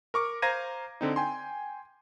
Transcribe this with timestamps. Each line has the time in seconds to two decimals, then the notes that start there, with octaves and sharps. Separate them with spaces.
0.14 A#4 C#6 D6
0.42 C5 F5 A#5 G#6 A#6 D#7
1.01 D3 C4 D#4
1.16 G5 G#5 C6